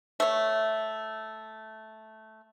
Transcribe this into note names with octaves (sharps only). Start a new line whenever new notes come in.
A3 C#5